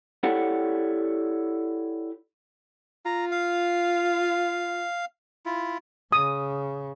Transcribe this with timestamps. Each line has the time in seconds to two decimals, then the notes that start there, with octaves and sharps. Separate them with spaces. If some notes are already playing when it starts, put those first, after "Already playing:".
0.23 E4 G4 A4 C#5 D5 F#5
3.06 F4 A#5
3.31 F5
5.46 E4 F4
6.12 C#3 D#6